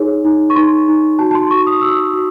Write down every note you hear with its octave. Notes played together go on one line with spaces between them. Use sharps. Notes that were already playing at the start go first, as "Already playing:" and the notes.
Already playing: D#4 G#4 C#5
D#4
C#6
D#4 C6
D#4
F#4 A5
A5
C6
F#4 C#6
D#6
F#4 E6
F#4